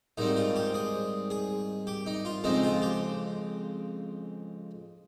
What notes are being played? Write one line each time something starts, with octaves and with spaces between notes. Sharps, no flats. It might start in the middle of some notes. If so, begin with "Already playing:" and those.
G#2 D#3 G3 C4 D#4
F4
G4
G#4
G#4
G4
D#4
F4
F2 C#3 G#3 C4 D#4
F4
G4